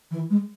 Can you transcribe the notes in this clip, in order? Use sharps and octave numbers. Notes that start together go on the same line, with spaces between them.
E3
G#3